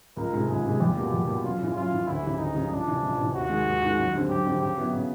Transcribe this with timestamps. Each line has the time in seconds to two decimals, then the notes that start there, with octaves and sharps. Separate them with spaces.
0.17 C#2 A#4
0.33 C3 D#3 G#3
0.48 C#2 G#4
0.65 C3 D#3 G#3
0.80 E2 G4
0.96 B2 G3 A#3
1.12 E2
1.27 B2 G3 A#3
1.44 F#2 F4
1.60 C#3 E3
1.75 F#2 F4
1.91 C#3 E3
2.07 D2 E4
2.23 C#3 E3 G3
2.39 D2 D#4
2.55 C#3 E3 G3
2.71 C#2 D4
2.87 C3 E3
3.03 C#2
3.18 C3 E3
3.34 D#2 F#4
3.50 D#3 G#3
3.66 D#2
3.82 D#3 G#3
3.97 F#2
4.13 D3 G3 C4
4.29 F#2 G4
4.46 D3 G3 C4
4.61 C#3 G4
4.77 F#3 B3 E4
4.93 C#3